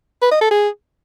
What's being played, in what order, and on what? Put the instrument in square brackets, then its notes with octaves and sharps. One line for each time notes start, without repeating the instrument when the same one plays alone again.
[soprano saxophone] B4
D#5
A4
G#4